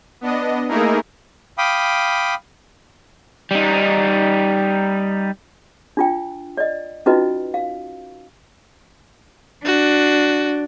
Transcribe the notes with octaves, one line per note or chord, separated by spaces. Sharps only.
B3 D4 D#5
A3 A#3 D#4 E4 G#4 A#4
F5 G5 B5 D6 D#6
G3 D#4
D4 F4 G5
D5 D#5
C#4 D#4 F4 F#4 B4 D#5
F5
D4 F#4